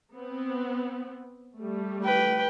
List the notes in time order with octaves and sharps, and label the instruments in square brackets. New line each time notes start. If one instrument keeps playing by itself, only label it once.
[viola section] B3 C4
G3 A3
[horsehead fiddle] B4 G5